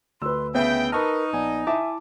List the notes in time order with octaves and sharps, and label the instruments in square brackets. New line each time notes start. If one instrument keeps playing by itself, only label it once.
[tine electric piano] D2 [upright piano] B4 E6 [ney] C6
[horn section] C#3 G5 [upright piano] B3 [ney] E5
[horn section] D#4 [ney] A#4 [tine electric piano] B4 C#6 F6 [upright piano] A5
[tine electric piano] A#1 B3 G#5 [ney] D5
[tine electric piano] E4 A5 D6 [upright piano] E5 [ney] G#5